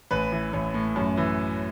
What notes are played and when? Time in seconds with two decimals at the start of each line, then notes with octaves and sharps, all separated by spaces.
0.11 A1 B4
0.32 E3
0.53 A1
0.74 A2
0.96 F#2
1.17 E3